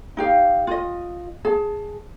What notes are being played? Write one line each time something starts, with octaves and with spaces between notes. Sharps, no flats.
D#4 G4 F5
F4 D#5
G#4 A5